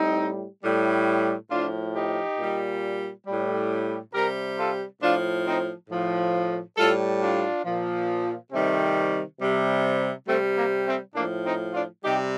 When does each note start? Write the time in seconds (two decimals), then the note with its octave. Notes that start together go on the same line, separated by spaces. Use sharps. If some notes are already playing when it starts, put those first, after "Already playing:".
Already playing: A2 G3 C4 D#4
0.63 A2 G3
1.51 A2 F3 D4 F4
1.94 D#4 G4
2.39 A#2 G3
3.26 A2 G3
4.13 C3 G3 G4 A#4
4.57 F4 A4
5.01 A2 F3 D4 F4
5.45 C4 D#4
5.89 A2 F3
6.76 A2 G3 F4 A4
7.20 D4 F4
7.64 A#2 F3
8.52 C3 D#3 G3 A3 C4
9.40 C3 G3
10.27 C3 G3 A3 C4
10.57 A#3
10.86 A3 C4
11.15 A2 F3 A#3 D4
11.44 C4 D#4
11.73 D4 F4
12.02 C3 G3 D#4 G4